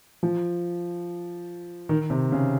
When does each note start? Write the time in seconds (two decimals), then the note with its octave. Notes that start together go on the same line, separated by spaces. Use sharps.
0.23 F3
1.89 D#3
2.10 C3
2.32 C#3